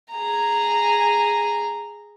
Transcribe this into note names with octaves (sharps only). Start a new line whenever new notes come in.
G#4 A#5